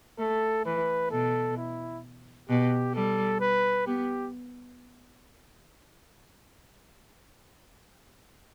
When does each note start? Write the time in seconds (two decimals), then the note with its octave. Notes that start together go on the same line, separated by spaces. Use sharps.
0.19 A3 A4
0.66 E3 B4
1.11 B2 A4
1.57 E4
2.49 B2 G4
2.94 G3 A4
3.41 B4
3.86 B3 G4